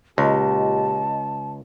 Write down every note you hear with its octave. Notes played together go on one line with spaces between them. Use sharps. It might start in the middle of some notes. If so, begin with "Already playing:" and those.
C#2 A#2 C#3 G4 D#5 A5